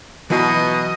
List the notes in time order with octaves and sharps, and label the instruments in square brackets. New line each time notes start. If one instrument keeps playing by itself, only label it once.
[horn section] B2 [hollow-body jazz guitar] E3 F#3 E5 [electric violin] D#5